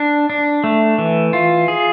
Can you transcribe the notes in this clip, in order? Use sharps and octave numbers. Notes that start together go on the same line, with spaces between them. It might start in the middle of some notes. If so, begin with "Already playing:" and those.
Already playing: D4
D4
A3
E3
F4
G#4